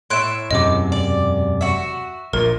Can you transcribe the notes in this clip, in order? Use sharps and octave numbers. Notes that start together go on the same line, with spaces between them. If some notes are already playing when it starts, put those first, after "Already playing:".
A2 E5 C6 F#6 D7
E1 F#2 C3 D#5 D6
D5
F#4 E5
A#1 A#2 A#4